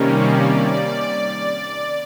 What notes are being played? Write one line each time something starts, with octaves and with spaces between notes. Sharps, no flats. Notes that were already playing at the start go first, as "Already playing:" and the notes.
Already playing: C3 D#3 G3 A#3 C#4
D5